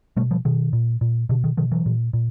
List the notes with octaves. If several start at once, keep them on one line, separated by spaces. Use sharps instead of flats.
B2 G3 A3
F3 G3
B2 D#3
A#2
A#2
B2 D3
D#3
B2 D#3 F3
E3 F#3
A#2
A#2